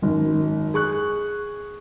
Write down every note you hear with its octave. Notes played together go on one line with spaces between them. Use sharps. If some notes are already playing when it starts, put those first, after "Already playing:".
G#1 F#2
G#4 C#6 F#6